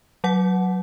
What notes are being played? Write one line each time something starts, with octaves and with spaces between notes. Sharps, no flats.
F#3 F#5